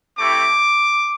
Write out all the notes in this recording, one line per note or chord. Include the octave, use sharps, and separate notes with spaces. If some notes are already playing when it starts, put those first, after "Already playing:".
A3 C4 E4 G4 D6